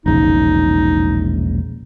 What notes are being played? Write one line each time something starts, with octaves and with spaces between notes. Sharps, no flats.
E1 A#1 C#3 D#4